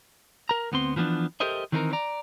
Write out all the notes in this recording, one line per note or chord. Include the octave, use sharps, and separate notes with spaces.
A#4 A#5
D2 B3 C4 C6
E3 F3 A#3 B3 D4
G4 A4 A#4 C5 D#5 E5
D#3 E3 C4 D#4 G4 A#4
D5 A#5